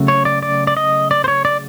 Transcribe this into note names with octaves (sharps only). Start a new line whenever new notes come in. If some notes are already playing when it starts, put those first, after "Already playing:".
Already playing: C#3 F#3 A3
C#5
D5
D5
D5
D#5
D5
C5
C#5
D5